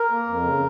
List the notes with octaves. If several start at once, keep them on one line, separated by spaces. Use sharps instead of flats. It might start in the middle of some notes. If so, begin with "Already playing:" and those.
Already playing: A#4
A#3
F2
C#3